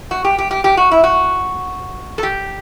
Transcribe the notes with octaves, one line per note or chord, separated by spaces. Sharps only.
F#4
G4
G4
G4
G4
F#4
E4
F#4
A4
G4